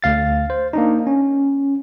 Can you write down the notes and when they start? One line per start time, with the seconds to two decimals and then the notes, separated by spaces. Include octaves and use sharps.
0.02 D2 F5 A6
0.50 C5
0.73 A#3 D4 D#4
1.07 C#4